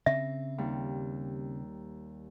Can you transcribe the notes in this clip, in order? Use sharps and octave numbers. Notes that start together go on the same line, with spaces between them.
C#3 C4 E5
D#2 G3